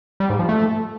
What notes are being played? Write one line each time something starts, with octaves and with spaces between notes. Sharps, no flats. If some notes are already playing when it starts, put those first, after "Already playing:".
G3
G#2
F3
A3